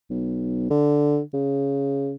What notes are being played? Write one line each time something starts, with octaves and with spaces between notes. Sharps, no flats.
B1
D3
C#3